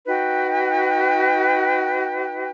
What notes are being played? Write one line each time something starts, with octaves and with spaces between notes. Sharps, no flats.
D#4 F#4 B4 G5